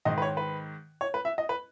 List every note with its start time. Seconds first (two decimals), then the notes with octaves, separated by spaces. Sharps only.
0.05 G#2 D#3 D#5
0.18 B4
0.22 C#5
0.37 B4
1.01 C#5
1.14 B4
1.25 E5
1.38 D#5
1.49 B4